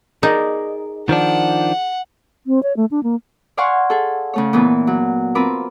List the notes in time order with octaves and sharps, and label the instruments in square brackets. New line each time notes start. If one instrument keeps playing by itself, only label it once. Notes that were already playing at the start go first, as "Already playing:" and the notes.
[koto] D#4 [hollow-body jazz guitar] G#4 A#4 D5
[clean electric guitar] D#3 F3 D4 [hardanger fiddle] F#5
[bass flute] C4
C#5
A3
D4
A#3
[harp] D5 F5 F#5 G#5 C6 C#6
G#4 A4
C#3 A3 C#5
A#2 E3 B3 B4
F#3
C4 F4 A#4 B4 D6